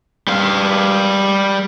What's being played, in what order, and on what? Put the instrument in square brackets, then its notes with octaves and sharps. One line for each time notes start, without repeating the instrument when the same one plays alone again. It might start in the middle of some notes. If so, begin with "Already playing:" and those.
[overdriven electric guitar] G3 F5